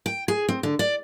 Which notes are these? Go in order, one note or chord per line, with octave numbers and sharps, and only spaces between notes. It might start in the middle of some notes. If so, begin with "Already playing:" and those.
G5
G#4
C4
D3
D5